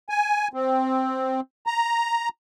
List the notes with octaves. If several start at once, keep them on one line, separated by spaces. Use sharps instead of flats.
G#5
C4
A#5